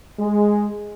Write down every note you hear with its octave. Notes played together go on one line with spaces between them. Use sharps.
G#3